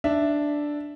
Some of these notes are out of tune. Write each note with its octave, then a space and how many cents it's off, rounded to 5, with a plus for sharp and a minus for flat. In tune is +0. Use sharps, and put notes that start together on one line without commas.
D4 +0 E5 +0